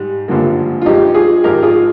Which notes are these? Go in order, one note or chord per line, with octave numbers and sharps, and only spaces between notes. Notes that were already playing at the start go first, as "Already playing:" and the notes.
Already playing: G#2 G3
G#1 G2 D3 F3 A#3
F4
G2 F3 G#3 D#4 G4
F4 G#4
G#1 G#2 F3 G#3 G4 A#4
F4 G#4